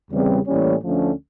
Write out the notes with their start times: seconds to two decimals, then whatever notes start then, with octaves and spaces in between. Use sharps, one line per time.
0.10 E2 C#3 E3 G3 C4
0.46 A2 E3 G3 A#3 C#4
0.83 D2 D3 F3 A3 C#4